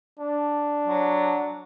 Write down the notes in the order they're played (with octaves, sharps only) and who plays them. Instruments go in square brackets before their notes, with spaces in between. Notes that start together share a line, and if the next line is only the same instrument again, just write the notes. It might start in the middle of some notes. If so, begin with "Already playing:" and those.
[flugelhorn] D4
[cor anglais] F#3